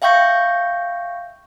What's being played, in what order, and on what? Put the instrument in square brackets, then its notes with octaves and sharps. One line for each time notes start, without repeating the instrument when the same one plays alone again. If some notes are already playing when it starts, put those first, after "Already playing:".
[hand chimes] E5 F5 G5 C#6 G6 A#6